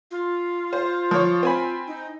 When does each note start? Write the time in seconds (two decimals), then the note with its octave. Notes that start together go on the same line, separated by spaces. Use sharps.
0.11 F4
0.73 C5
1.11 F3 C#5
1.43 C4 G#5 B5
1.87 D#4